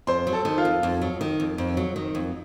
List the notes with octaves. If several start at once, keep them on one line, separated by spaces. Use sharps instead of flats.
F2 C5 C6
F#3
A4 A5
D#3
F4 F5
F2
F2
F#3
D#3
F2
F2
F#3
D#3
F2